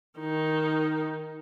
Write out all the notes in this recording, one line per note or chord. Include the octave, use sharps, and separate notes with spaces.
D#3 D#4